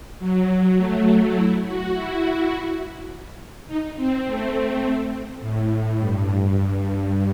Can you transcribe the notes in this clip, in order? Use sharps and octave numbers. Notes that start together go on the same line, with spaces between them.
F#3
A3
E4
F#4
E4
D#4
C4
A3
A2
G2